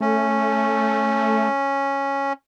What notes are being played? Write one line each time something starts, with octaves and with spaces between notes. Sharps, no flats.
A3 C#4